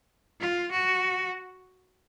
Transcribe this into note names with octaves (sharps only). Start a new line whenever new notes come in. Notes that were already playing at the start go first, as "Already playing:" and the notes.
F4
F#4